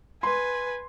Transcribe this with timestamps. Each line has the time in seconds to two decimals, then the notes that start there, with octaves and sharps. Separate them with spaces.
0.23 B4 G#5 C6